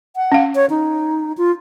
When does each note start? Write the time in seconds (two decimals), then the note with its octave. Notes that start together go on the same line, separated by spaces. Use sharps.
0.16 F#5
0.32 C#4 F5
0.55 C#5
0.70 D#4
1.38 F4